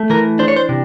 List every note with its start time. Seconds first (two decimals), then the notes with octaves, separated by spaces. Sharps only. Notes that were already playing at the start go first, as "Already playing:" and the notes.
Already playing: A3
0.10 E3 A#4
0.39 D4 C5
0.48 C#5
0.56 C5
0.69 C3